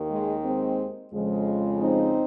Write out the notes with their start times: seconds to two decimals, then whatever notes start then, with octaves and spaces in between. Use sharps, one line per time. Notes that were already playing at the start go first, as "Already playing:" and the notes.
Already playing: D#2 D#3
0.10 G#3
0.43 G#3 C4
1.12 F2 C#3 F3 G#3
1.80 C4 D#4